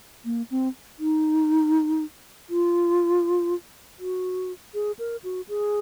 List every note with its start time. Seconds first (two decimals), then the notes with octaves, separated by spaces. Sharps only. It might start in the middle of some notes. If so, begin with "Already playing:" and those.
0.25 A#3
0.51 C4
0.99 D#4
2.50 F4
3.99 F#4
4.74 G#4
4.99 A#4
5.24 F#4
5.48 G#4